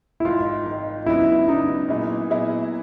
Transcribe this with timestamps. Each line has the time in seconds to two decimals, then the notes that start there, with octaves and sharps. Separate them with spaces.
0.20 E4
0.25 G#1 G#2 D#3 F4
0.65 G#1 G#2 D#3
1.06 C#3 F#3 B3 D4 E4
1.48 C#3 F#3 B3 D4 D#4
1.88 A#2 F#3 B3 E4 G#4
2.30 A#2 F#3 B3 E4 G#4